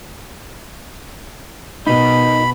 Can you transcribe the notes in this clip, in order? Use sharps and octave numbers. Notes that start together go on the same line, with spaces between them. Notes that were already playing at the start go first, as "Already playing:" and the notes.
B2 D#4 A#4 D#5 B5